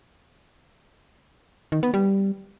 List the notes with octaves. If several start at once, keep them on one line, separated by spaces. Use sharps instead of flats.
D#3
B3
G3